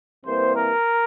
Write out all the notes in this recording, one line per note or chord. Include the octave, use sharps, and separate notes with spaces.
C2 C3 E3 A#3 C5
A#4